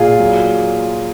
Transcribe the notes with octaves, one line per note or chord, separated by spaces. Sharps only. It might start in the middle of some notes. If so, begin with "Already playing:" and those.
Already playing: A#2 F4 G#4
F#3